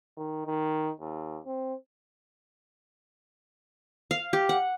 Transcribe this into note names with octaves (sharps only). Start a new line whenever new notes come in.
D#3
D#3
D#2
C4
F5
G4
F#5